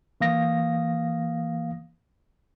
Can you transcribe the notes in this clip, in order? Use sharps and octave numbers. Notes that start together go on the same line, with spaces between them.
E3 A#3 F5 D#6 A#6